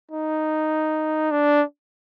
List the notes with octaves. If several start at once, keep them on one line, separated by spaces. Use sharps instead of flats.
D#4
D4